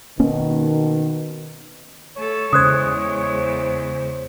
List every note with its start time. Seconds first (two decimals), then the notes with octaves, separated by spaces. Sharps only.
0.20 B2 D#3 A#3 C#4
2.17 A3 A4 C#5
2.53 E2 C#3 G#3 C5 D#6 F#6 G#6